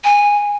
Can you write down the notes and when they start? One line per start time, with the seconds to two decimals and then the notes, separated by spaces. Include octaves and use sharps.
0.04 G#5